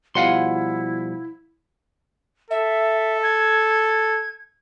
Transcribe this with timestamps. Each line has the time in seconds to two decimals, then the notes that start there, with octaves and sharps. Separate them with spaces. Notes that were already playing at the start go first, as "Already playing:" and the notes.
0.15 B2 F3 G3 E4 F5 F#5 C6
2.50 A4 E5
3.23 G#6